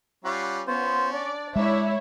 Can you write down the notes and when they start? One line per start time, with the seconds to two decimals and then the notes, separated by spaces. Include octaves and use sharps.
0.24 G3 C#4 F4 F#5
0.67 B3 C#4 F4 C5
1.12 D4 D5
1.56 G#3 E4 C#5 D5 E5